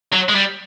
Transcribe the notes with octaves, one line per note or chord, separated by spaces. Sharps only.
F#3
G#3
G3